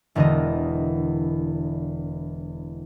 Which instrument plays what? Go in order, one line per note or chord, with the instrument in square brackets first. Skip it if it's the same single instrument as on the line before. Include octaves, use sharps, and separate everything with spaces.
[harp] E1 E2 D3 G#3 A#4 D#5